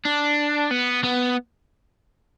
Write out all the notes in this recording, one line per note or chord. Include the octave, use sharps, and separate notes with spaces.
D4
B3
B3